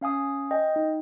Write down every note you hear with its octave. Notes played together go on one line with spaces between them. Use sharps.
C#4 F5 G#5 D#6
D#5 G5
D#4